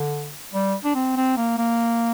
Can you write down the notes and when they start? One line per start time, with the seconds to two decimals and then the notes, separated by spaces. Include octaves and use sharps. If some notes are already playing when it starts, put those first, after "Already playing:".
Already playing: D3
0.52 G3
0.85 D4
0.95 C4
1.16 C4
1.37 A#3
1.58 A#3